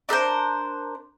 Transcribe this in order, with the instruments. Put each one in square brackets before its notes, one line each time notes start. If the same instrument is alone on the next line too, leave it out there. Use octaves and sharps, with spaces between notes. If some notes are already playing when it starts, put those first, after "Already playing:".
[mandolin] D4 A4 A#4 C5